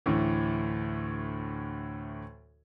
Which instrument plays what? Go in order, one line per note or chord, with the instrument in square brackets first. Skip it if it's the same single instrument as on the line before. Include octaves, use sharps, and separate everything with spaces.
[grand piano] D2 A2 E3